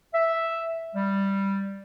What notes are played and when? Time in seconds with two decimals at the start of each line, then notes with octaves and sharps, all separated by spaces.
0.14 E5
0.95 G3